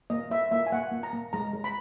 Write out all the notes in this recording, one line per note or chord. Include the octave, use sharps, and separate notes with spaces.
A#3 D#5
A#3 E5
A#3 E5
G#5
A#3 F#5
A#3
A#5
A#3
G#3 A#5
G#3
B5